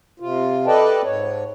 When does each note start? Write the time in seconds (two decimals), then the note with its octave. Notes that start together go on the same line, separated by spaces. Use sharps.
0.20 C3 F4
0.67 A4 B4 D5 D#5 G5 A5
1.04 G#2 C#5